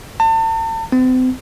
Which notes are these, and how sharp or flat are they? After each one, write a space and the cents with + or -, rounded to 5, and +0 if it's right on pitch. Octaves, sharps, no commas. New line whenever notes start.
A5 +40
C4 -40